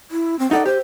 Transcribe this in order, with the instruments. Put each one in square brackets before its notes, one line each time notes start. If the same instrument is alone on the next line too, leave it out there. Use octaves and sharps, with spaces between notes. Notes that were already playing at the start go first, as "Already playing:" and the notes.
[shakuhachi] E4
C4
[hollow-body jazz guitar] D#4 A4 D5 [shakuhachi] F#5
[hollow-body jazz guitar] G4 [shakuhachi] C5